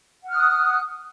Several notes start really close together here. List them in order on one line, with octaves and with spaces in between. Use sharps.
F#5 F6 F#6 D#6